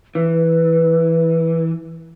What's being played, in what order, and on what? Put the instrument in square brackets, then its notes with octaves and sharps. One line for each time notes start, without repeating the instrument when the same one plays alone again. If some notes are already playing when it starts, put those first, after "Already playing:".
[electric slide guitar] E3 [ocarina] B4